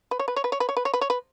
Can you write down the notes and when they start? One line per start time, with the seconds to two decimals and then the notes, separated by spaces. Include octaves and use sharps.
0.11 B4
0.19 C#5
0.28 B4
0.36 C#5
0.44 B4
0.52 C#5
0.60 B4
0.69 C#5
0.77 B4
0.85 C#5
0.94 B4
1.01 C#5
1.10 B4